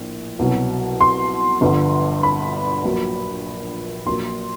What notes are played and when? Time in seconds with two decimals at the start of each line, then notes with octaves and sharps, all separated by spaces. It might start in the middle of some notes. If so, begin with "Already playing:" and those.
Already playing: A#1 A2
0.39 C2 B2 F#3
1.01 C6
1.61 G1 G2 D3 F3
2.23 B5
2.84 A#1 A#2 F#3
4.06 A#1 A#2 F#3 C6